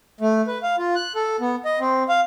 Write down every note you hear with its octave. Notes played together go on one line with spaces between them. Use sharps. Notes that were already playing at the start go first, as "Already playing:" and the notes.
A3
B4
F5
F4
F#6
A4
B3
D#5
C4
F5